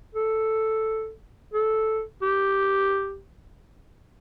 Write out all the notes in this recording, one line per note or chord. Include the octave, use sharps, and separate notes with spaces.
A4
A4
G4